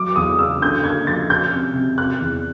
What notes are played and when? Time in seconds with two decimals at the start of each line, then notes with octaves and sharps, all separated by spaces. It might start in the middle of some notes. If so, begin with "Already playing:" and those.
Already playing: F#3 D6
0.16 E2 D#6
0.39 C#3 E6
0.62 D3 G6
0.84 A#3 G#6
1.07 F3 A6
1.30 C#4 G6
1.53 C3
1.75 C3
1.98 C3 F#6
2.20 E2